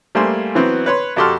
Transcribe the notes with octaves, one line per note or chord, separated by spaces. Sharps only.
G3 A3 A#3 C5 G#5 C6
E3 F#3 B3 C4
B4 C#5 C6
F2 F#4 G4 A4 C6 F6